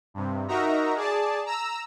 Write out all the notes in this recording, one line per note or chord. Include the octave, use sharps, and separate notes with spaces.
G2 C3
D#4 F#4 A#4 E5 A#5
G#4 D5 A5
A#5 E6